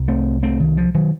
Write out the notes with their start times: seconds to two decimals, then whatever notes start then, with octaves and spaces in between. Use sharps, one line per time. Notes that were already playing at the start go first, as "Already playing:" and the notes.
Already playing: C2 C3
0.08 A3 C4
0.43 A3 C4
0.60 D#3
0.77 F3
0.94 D#3 F#3